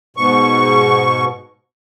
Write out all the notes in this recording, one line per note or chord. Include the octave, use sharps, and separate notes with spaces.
G#2 B2 C#6